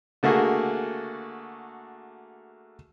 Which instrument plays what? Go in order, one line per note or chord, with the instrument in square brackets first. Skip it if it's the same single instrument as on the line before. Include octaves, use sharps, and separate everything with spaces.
[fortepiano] D3 A3 A#3 F#4 G#4